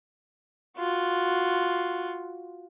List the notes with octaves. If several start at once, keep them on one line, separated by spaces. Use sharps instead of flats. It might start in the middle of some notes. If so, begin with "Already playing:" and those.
F4 F#4